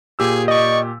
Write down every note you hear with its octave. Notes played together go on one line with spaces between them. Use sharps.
A#2 G4 G#4 E6
D5 D#5 C#6